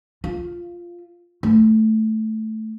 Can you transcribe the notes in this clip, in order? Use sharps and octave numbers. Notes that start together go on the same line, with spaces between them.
F4
A3